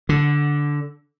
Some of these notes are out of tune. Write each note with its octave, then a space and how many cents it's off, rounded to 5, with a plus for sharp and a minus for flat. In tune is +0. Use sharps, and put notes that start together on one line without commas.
D3 -10